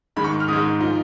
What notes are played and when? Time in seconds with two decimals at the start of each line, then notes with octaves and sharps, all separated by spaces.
0.16 G#2 D#3 G#3 B5
0.24 C#6
0.40 F6
0.48 G#2 D#3 G#3 D#6
0.81 F3 A#3 D#4